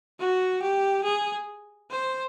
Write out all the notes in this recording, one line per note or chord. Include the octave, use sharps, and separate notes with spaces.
F#4
G4
G#4
C5